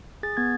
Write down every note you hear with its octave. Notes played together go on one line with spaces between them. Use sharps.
G#4 A6
B3 G#6